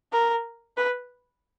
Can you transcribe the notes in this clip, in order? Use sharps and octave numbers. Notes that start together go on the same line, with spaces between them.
A#4
B4